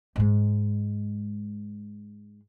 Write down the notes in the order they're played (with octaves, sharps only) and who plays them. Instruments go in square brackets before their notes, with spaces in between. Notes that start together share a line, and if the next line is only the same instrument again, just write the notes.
[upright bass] G#2 G#3